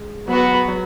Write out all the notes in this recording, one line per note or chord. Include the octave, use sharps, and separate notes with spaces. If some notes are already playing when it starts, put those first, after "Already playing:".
Already playing: G#3
F#3 B3 F#4 B4
F#3